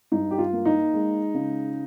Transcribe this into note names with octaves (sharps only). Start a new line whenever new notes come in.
G2 D#4
G4
F4
A#3
D#4
G#3
C#3